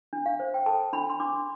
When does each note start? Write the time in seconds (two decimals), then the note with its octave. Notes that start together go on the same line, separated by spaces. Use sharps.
0.13 D4
0.26 F5
0.40 C5
0.54 G5
0.66 A4 A5
0.93 D4 B5
1.10 C6
1.20 D4 D6